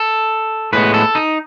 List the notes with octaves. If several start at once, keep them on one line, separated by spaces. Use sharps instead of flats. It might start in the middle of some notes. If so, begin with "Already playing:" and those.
Already playing: A4
A2 G#3 B3 B4
A4
D#4